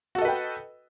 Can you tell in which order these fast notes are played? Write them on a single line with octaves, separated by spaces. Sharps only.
F#4 A4 D#5 B4 G5